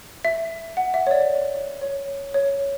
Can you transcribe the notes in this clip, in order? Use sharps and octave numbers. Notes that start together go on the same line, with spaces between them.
E5
F#5
E5
C#5
D5
C#5
C#5